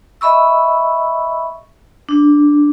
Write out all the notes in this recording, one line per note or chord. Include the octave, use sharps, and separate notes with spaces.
D#5 E5 B5 C#6 E6
D4